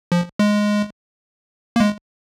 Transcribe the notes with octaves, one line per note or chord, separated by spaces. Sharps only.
F3
G#3
A#3
G#3